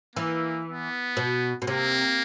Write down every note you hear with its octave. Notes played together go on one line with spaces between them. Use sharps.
E3 A#3
B3
B2
B2
C3 A#3